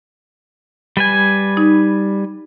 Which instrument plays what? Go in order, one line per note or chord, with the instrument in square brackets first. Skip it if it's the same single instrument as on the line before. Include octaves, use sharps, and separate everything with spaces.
[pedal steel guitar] G3 B4 G#5
[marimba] D#4